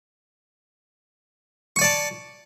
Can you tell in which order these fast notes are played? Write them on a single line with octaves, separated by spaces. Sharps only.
C#6 G#5 D5 A5